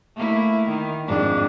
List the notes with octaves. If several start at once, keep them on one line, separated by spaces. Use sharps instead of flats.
A3 A#3 E4
D#3
F2 G#2 D4